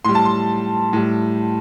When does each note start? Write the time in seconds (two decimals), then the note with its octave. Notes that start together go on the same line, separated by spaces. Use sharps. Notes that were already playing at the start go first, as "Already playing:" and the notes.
0.05 A2 G3 C6
0.15 A5
0.25 C6
0.93 A2 G3